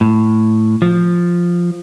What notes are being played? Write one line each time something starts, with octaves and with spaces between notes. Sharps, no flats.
A2
F3